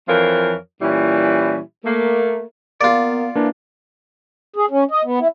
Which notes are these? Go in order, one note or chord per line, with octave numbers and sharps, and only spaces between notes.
F2 E3 F3 F4 A#4 C#5
A#2 E3 G3 C#4 E4
A3 A#3
A#3 B3 F4 D5
E3 A#3 D4
G#4
C#4
D#5
B3
E4